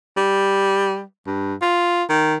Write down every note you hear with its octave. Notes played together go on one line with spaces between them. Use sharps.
G3
G2
F4
D#3